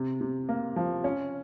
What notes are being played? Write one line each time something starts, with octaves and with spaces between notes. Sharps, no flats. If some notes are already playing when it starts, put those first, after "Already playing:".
Already playing: C3
C3
A#3
F3
C#4